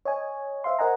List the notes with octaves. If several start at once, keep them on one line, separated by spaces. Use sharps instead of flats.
C#5 D#5 G#5
C5 E5 F5 C6
A#4 C5 D#5 F#5 G#5 A#5